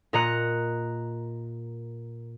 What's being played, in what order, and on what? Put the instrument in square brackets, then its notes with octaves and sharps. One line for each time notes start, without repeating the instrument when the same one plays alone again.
[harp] A#2 A#4 D#5 A#5 F#6 C#7